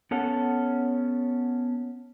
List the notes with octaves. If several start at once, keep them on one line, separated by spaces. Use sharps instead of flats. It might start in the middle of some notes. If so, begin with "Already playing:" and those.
B3 C#4 A4 F#5